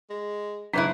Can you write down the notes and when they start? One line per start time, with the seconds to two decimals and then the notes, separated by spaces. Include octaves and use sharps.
0.10 G#3
0.73 F#1 G#2 G#3 D4 E4 B4 F#6